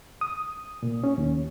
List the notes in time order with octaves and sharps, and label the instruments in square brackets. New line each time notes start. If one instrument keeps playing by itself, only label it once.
[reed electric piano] D#6
A#2
C#4
D#2